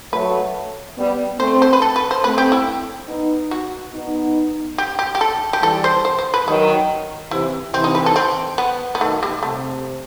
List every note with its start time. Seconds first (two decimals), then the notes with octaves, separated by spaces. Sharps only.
0.13 F#3 A3 B4
0.98 G3 B3
1.39 A3 C4 C5
1.62 C5
1.73 B4
1.82 A4
1.96 B4
2.11 C5
2.24 A3 C4 B4
2.38 G4
2.52 E4
3.08 B3 D#4
3.51 F#4
3.93 B3 D#4
4.78 G4
4.99 G4
5.15 G4
5.21 A4
5.53 G4
5.62 E3 G3 A4
5.84 C5
6.05 C5
6.19 C5
6.34 B4
6.47 D#3 F#3 D#4
7.31 C3 E3 E4
7.74 C3 E3 C4
7.84 D#4
7.95 B4
8.06 A4
8.16 C4
8.58 B3
8.95 B3
9.01 B2 D#3 A3
9.23 G3
9.43 C3 A3